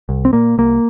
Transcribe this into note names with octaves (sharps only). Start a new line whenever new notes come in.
C2
C4
A#2 A#3
C2 A#3